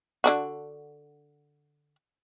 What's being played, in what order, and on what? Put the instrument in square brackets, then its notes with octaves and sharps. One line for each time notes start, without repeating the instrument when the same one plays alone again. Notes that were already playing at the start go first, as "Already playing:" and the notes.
[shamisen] D3 D4 F#4